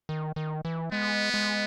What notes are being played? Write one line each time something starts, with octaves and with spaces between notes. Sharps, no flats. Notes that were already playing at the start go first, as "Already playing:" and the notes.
D#3
D#3
E3
G#3 B3
G#3